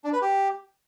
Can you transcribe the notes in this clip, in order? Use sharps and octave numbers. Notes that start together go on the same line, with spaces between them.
D4
B4
G4